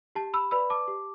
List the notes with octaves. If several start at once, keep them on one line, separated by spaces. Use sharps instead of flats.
G4 A5
B5 E6
B4 D5 B5 E6
A5 D6
G4